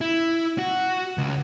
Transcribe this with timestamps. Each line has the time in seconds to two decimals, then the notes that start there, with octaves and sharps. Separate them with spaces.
0.01 E4
0.58 F#4
1.18 C#2